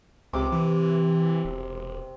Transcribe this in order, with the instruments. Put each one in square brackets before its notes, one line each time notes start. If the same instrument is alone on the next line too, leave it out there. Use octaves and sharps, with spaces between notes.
[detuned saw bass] C#2 [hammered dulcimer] C3 D6
[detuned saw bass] E3
E1